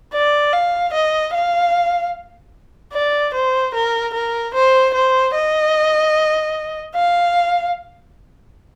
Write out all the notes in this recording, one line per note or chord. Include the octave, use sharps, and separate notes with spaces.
D5
F5
D#5
F5
D5
C5
A#4
A#4
C5
C5
D#5
F5